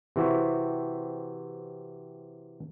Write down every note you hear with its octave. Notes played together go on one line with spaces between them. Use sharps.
C3 E3 C4 E4 F#4 G4